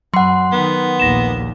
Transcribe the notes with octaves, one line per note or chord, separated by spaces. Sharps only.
F#2 F#3 F#5 C6
D#3 B3
A#1 D#2 A#6 E7